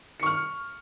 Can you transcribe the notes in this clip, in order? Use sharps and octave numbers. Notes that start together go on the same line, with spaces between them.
C#6 F6 C#7